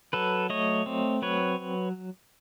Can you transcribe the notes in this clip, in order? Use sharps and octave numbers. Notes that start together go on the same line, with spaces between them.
F#3 A4 B4
A3 C#5 D#5
C4
F#3 B4 C#5